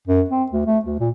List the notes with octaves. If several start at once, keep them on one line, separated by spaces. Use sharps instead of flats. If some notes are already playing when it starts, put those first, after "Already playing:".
F#2
C4
D2
A3
D2
A#2